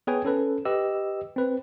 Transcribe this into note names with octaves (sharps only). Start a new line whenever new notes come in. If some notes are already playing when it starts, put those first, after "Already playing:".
B3 G#4 B4 C#5 G5 G#5
C#4 A4 B4
G4 B4 D#5 E6
C4 B4